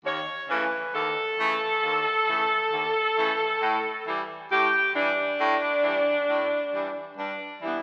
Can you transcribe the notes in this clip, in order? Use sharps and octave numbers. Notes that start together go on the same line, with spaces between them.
D#2 C#5
C#3 E3 A3 B4
D#2 A4
C#3 E3 A3
D#2
C#3 E3 A3
D#2
C#3 E3 A3
A2
E3 G3
A2 G4
E3 G3 D4
A2
E3 G3
A2
E3 G3
G2 D4
E3 G3 B3 E4